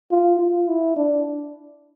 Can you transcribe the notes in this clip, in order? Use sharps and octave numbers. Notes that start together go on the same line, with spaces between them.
F4
F4
E4
D4